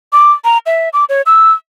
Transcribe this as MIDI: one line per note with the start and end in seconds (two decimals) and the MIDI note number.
0.13 0.32 86
0.45 0.58 82
0.66 0.89 76
0.93 1.05 86
1.09 1.22 73
1.26 1.52 88